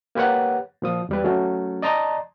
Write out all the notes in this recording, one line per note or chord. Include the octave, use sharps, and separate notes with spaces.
A#3 G4 B4 C#5 F#5
A#2 F3 D#6
E2 G3 B4
F#3 A3 C#4
D5 D#5 A5 A#5 C6 D#6